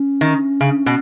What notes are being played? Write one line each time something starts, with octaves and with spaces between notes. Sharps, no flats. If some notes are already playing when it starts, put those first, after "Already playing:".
Already playing: C#4
D#3
C#3
B2